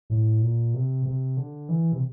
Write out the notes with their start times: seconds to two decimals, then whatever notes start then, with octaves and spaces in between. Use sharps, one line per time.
0.10 A2
0.41 A#2
0.74 C3
1.06 C3
1.37 D3
1.69 E3
1.92 C3